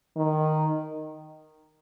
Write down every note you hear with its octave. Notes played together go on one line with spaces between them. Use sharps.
D#3